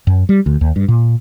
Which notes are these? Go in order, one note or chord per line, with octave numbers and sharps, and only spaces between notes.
F#2
G3
D2
D#2
G2
A#2